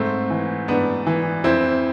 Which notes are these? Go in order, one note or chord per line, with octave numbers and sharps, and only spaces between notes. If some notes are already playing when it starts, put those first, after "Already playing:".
Already playing: G#2 A3 C4
E3
G#2 B3 D4
E3
F2 C4 E4